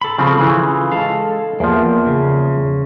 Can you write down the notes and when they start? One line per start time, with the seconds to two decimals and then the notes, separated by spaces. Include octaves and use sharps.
0.01 A4 B5
0.18 C#3 F3 C4
0.39 C#3 E3 F4
0.92 G#3 A4 F5
1.60 E2 F3 A#3
2.06 C#3